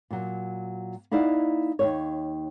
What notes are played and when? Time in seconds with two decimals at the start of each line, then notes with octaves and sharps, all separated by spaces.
0.11 A#2 F#3
1.11 A#3 D#4 E4 D5 F5 F#5
1.79 D#2 A#2 C#5